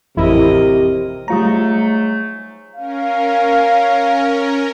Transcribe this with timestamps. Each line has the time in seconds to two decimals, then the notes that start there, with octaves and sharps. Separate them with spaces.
0.17 A1 F2 C3 E4 A#4 D#5
1.28 G#2 F#3 G3 A3 F4 A#5
2.76 C#4 A#4 F5